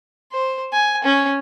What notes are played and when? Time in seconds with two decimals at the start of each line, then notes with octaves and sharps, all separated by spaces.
0.32 C5
0.72 G#5
1.04 C#4